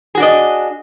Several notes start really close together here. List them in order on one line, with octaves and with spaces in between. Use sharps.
G#4 F#4 D4 D#5